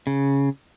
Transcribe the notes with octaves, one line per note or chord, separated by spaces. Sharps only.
C#3